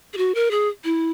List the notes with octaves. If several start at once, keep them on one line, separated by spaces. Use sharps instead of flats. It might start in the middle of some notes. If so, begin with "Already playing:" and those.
G#4
F#4
A#4
G#4
E4